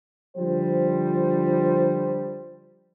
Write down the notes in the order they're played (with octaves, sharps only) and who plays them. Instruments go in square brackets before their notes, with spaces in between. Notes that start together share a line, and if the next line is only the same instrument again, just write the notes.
[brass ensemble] D3 F3 G3 C5